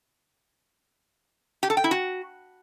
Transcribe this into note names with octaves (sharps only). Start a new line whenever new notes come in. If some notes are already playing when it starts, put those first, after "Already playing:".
G4
A4
G5
E4
F#4